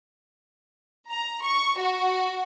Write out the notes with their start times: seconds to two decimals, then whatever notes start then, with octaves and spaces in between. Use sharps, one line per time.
1.10 A#5
1.43 C#6
1.79 F#4